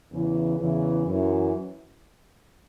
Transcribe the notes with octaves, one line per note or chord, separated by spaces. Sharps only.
E2 C#3 E3
E2 C#3 E3
F#2 E3